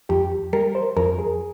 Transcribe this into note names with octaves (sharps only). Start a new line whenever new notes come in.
F2 G4
G3 A#4
C5
F2 A#4
G#4